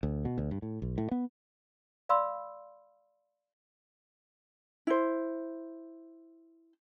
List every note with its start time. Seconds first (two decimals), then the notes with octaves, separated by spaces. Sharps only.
0.03 D2
0.25 B2
0.38 D2
0.51 G2
0.62 A2
0.82 B1
0.98 A2
1.11 B3
2.09 D5 F5 B5 C6 E6
4.87 E4 C5